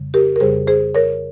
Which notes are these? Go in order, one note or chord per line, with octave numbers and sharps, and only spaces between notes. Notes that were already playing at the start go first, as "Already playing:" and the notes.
Already playing: F2 C#3 G3
G4 A#4
A#4
F2 C#3 G3 G#4 C5
G#4 C5
A#4 C#5